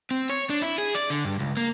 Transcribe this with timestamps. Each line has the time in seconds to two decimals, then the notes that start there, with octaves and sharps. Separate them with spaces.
0.11 C4
0.29 C#5
0.50 D4
0.62 E4
0.78 G#4
0.95 D5
1.10 D3
1.25 G2
1.39 C#2
1.57 A#3